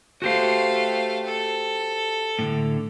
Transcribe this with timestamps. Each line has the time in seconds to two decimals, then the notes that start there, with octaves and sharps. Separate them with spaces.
0.22 A3 F#4 G4 C5 F5
1.26 A4
2.39 A2 D3